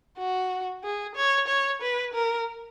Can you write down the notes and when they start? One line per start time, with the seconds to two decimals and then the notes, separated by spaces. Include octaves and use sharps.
0.18 F#4
0.83 G#4
1.15 C#5
1.48 C#5
1.81 B4
2.14 A#4